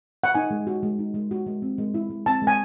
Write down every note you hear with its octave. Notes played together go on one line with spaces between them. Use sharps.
F#5
D#4 G#5
G#3
F#4
G#3
D#4
G#3
F#4
G#3
C4
G#3
E4
G#3
C4 A5
G#3
G#5